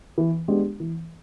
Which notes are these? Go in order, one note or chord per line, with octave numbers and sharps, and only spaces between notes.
E3
G#3 B3 D4 G4
E3